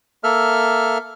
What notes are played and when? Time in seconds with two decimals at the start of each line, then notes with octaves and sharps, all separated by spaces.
0.24 A#3 A4 E5 F6